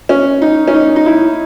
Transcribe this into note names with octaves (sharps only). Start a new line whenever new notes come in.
C#4
D#4
C#4
D#4
D#4
E4